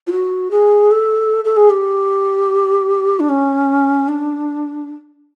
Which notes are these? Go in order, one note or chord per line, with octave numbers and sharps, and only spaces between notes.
F4
F#4
G#4
A4
A4
G#4
G4
D4
C#4
D4